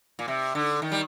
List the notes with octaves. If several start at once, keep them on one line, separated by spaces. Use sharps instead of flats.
A#2
C3
D3
D#3
G3